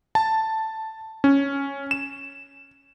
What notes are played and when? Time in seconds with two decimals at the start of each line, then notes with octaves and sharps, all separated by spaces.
0.15 A5
1.24 C#4
1.91 E7